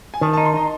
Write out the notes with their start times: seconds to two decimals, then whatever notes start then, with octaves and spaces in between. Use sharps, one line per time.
0.14 G#5
0.21 D#3 A5
0.33 A5
0.37 D#4
0.45 C6
0.54 D#4 D#5